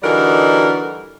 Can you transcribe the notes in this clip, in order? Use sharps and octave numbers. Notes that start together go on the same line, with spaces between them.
D3 E3 G3 D#4 F#4 A#4